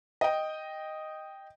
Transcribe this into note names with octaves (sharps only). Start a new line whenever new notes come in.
D#5 G5